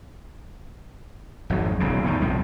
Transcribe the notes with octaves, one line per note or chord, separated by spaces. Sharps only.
G#1 F2 F#3
D#1 B1 C#3
E2 A2 D#3
A#1 F2 C3 G3